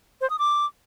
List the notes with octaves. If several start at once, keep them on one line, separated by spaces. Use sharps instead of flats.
C5
D#6
D6